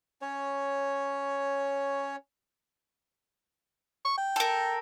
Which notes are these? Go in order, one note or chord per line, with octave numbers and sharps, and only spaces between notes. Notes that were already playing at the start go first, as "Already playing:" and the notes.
C#4 C#5
C#6
G5
A4 A#4